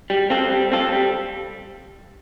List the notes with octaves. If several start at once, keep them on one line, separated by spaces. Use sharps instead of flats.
G3
C4 F4 A4
G3
C4 F4 A4
G3